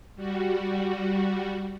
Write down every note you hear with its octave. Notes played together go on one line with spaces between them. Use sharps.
G3 F#4